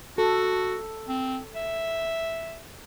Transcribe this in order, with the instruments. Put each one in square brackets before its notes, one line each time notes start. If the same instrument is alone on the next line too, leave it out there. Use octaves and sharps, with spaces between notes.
[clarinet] F#4 [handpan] A4
[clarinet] C4
E5